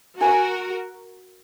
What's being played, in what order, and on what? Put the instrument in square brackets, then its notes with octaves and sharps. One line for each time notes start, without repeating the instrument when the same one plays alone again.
[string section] F#4 A#4 [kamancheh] G#5